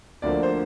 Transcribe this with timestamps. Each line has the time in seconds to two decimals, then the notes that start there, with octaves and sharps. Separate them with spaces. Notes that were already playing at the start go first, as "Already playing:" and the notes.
0.22 D2 D3 F3 A#3 D5
0.43 C5